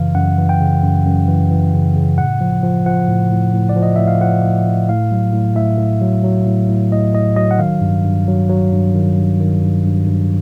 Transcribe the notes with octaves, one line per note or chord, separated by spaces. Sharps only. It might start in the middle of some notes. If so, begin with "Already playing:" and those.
Already playing: F#2 C#3 E3 F5
F#2 F#5
E3
G5
C#3
F#2
F#2
E3
E3
C#3
C#3
A2 F#5
F3
F3
F3 F#5
A2
A2
A2
D5
F3
D#5
A2 E5
F5
F3 F#5
A2
A2
A2 F5
F#3
A2
A2 E5
A2
F#3
F#3
A2
A2
A2 D#5
A2 D#5
F#3 D#5
F#5
D#3 F5
G2
G2
F#3
F#3
G2
D#3
G2
D#3
G2
G2
G2